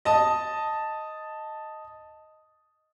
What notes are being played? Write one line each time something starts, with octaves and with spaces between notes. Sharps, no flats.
D#5 A5 D#6